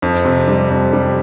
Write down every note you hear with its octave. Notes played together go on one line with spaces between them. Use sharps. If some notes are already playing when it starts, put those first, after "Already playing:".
F2
C3
G3
F2
G3